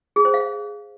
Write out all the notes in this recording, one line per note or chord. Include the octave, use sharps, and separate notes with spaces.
G#4
C5
F5